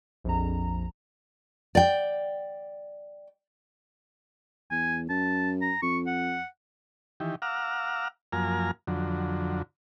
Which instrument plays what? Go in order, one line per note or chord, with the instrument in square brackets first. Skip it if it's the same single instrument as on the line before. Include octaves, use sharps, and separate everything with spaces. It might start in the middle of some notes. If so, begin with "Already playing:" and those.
[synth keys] A#1 F2 A#5
[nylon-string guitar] D5 G5
[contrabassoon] E2 [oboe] G#5
[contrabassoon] F#2 [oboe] A5
[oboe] A#5
[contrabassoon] F2 [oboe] C#6
[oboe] F#5
[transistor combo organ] D#3 E3 G4
F5 F#5 A#5 D6 E6 F6
F#2 F3 A#3 G#5 A#5 F6
F2 D3 F#3